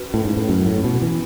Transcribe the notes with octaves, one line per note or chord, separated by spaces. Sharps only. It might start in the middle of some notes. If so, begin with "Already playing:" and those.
Already playing: C#4 F#4 B4
A2
G#2
A2
F#2
A2
B2
E3